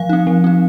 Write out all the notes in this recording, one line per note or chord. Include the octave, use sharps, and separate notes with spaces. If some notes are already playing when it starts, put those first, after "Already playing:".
Already playing: F3 F5
C4 D#4
F3
C4 D#4